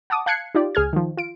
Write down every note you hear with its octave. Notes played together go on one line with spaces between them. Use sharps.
F#5 A5 D6 D#6
F5 A5 F#6 G#6 C7 C#7
D#4 F4 G4 D5
C#2 G#4 F6 G#6
D#3 F3
F4 D7